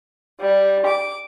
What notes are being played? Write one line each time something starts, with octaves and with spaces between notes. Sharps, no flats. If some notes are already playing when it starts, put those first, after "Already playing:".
G3
D6